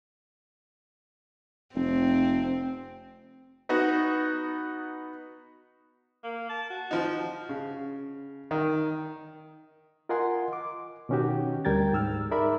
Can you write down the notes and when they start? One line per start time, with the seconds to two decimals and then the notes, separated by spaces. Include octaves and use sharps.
1.75 F1 C4
3.69 B3 D#4 F#4
6.23 A#3
6.49 A5
6.70 F#4
6.91 F3 D#4
7.49 C#3
8.51 D#3
10.09 F4 A#4 D#5 F#5 G#5 C6
10.53 D6
11.09 B2 D#3 C#4 D#4 F#4 G4
11.65 D2 G3 A#4 G5 G#6 A6
11.93 G#2 E6 F6
12.31 D#4 G#4 A#4 D5 E5 B5